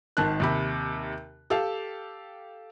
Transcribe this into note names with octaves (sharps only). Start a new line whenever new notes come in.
G#1 D#3 A5 F#6
D#2 C3 B5
G4 A4 F5